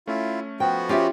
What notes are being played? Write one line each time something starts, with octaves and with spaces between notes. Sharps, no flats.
A3 C#4 E4 F4
F3 B3 F#4 G5
C#4 F4 G4 E5